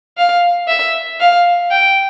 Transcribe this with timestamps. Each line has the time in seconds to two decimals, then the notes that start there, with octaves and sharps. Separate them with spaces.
0.17 F5
0.68 E5
1.20 F5
1.71 G5